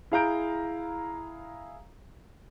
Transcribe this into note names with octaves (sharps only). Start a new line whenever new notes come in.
E4 G#4 F5 A#5 G6 D7